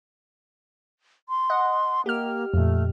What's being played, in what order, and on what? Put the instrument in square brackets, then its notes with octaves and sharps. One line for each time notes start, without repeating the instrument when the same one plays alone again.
[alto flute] C6
[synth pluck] D#5 F#5
[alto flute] A#3 [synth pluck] G4 F6
[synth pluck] F2 A#2 [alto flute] A3